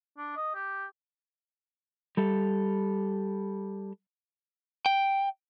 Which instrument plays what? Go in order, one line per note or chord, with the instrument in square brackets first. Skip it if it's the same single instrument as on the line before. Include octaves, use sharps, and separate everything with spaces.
[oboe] D4
D#5
G4
[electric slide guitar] G3 A4
[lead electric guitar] G5